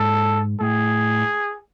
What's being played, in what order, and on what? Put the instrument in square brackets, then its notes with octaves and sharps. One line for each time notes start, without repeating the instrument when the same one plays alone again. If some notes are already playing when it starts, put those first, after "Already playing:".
Already playing: [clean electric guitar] G#2 [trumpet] A4
[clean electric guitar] A2 [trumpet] G#4